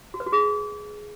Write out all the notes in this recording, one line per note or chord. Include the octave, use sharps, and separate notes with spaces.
F#4
B4
F#4
G#4